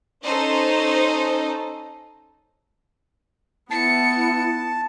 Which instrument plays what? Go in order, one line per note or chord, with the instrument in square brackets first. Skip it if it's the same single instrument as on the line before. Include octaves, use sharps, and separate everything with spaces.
[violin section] C#4 D#4 A4 C5
[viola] B3 [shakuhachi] E4 [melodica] A5 [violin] C#7